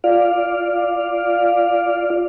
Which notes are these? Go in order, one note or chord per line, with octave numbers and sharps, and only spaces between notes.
F4 D5 F5